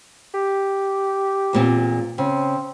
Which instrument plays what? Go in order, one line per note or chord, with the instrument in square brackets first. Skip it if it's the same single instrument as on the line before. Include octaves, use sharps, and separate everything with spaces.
[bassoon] G4
[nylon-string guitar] E2 A#2 C4
[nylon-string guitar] C#3 [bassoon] C4